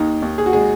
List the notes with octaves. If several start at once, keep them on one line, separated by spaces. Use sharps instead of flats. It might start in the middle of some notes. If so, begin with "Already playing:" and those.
Already playing: D#2 D#4
D#2
G#4
F#4
G#3 G#4